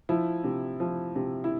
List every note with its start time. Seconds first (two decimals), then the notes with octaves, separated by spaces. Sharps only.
0.09 F3 E4
0.44 C3
0.80 F3
1.16 C3
1.44 E4